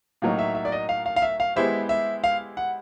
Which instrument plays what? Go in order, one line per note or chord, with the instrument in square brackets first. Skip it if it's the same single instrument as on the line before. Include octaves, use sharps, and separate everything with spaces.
[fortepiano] A2 F#3 A#3 D#4 [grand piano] F5
[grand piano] E5
E5
D5
D#5
F5
F5
F5
E5
F5
[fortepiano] G#3 B3 E4 G4 C5 [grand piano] E5
[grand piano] E5
F5
F#5